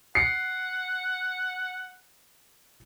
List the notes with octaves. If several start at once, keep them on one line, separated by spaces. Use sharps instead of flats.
F#5 C7 C#7